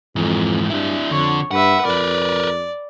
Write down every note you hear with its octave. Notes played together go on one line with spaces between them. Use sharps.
F2 G#2 E3
G2 D4 E4
F2 D3 C#5
G2 B4 E5 F#5
F2 A#4 B4 D5